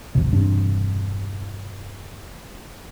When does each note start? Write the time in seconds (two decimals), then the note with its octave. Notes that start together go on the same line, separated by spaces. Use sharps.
0.15 D1 G#1 C3
0.32 E1 G2 C3 D4